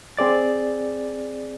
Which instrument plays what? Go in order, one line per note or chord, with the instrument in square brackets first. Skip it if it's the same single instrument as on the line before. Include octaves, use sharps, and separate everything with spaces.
[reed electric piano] C4 G#4 D5 A6